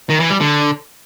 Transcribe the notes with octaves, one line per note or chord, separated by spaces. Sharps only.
D#3
E3
G3
D3